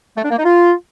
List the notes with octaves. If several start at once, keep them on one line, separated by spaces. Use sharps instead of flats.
A3
D4
A#3
D#4
F4